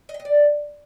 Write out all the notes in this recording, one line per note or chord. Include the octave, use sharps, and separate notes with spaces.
D#5
G5
D#5
D5